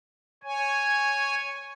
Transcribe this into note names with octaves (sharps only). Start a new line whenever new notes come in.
C#5 G#5